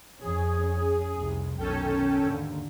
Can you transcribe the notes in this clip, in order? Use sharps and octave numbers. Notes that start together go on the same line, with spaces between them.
F2 C#4 G#4
F1 C2 C3
B1 D#3 C#4 A4 G5
D#2 G#2 D3